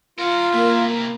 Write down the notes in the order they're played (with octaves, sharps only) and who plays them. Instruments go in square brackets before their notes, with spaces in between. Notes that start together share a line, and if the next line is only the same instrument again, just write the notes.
[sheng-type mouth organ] F4 [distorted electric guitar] A#4 F#5
[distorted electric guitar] C3 E4 [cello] A#3 [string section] A#4